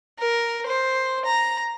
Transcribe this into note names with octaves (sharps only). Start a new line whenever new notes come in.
A#4
C5
A#5